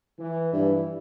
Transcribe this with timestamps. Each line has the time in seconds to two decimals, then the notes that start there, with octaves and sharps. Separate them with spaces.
0.19 E3
0.53 G2 E3